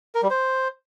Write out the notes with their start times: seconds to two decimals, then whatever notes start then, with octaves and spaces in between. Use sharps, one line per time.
0.15 A#4
0.22 G3
0.30 C5